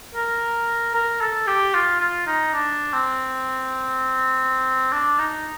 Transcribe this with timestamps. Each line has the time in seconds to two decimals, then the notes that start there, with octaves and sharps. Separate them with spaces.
0.15 A#4
0.94 A#4
1.21 A4
1.47 G4
1.74 F4
2.01 F4
2.27 D#4
2.54 D4
2.93 C4
4.92 D4
5.19 D#4